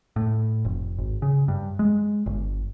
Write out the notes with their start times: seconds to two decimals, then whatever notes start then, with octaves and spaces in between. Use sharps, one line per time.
0.16 A2
0.65 F1
0.98 G#1
1.22 C#3
1.48 G2
1.79 G#3
2.26 G1